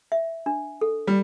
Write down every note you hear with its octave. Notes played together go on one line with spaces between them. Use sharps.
E5
D4
A4
G3